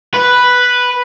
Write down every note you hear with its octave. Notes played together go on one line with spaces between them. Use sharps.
B4